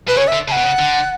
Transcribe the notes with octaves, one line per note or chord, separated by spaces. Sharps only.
B2 B4
C#3 C#5
D3 E5
C#3 A5
B2 F#5
C#3
D3